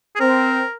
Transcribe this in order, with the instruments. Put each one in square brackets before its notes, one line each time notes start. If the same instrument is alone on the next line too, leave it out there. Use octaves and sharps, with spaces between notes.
[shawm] G#4
[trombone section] C4 [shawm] A#4